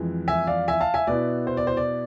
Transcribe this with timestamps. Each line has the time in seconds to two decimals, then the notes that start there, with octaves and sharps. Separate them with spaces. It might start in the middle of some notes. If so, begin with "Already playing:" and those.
Already playing: F2 E3 G#3
0.28 E5 G#5
0.47 D5 F5
0.68 E5 G#5
0.81 F5 A5
0.94 E5 G#5
1.07 B2 B3 E4 D5
1.47 C5
1.57 D5
1.67 C5
1.77 D5